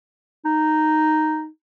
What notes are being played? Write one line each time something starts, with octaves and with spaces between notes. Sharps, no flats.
D#4